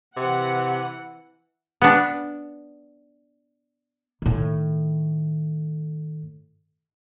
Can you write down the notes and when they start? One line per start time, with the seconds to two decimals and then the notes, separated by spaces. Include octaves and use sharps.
0.17 C3 E3 F#5
1.82 B3 D4
4.22 A2 D#3